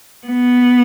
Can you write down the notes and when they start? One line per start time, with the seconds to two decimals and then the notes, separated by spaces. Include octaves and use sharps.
0.27 B3